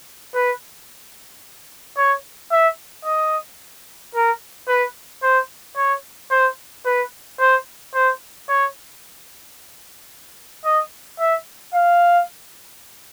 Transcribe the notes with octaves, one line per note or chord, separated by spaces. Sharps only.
B4
C#5
E5
D#5
A#4
B4
C5
C#5
C5
B4
C5
C5
C#5
D#5
E5
F5